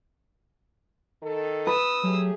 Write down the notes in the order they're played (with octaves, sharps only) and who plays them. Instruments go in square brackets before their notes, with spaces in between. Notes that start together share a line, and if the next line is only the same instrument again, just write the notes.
[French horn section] D#3 A4
[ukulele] B4 [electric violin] D#6 E6
[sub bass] F#3 [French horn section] A3 G4 G#4